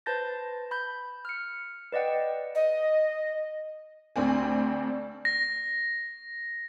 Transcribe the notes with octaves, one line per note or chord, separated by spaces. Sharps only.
B4 C5 A5 G6 A6 A#6
B5 G6
F6 C#7
B4 D5 D#5 F#5 G5
D#5
D2 C4 D4 G#5
A#6